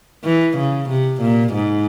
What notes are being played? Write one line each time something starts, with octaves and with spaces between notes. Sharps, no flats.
E3
C#3
C3
A#2
G#2